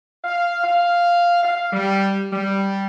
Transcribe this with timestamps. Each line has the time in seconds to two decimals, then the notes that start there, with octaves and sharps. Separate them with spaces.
0.24 F5
0.64 F5
1.43 F5
1.72 G3
2.32 G3